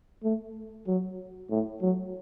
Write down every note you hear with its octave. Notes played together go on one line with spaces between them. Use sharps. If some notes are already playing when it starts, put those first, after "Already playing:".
A3
F#3
A2
F#3